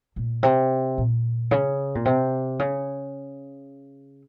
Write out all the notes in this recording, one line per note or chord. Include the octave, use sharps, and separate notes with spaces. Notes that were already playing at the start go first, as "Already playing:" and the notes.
A#2
C3
A#2
C#3
A#2
C3
C#3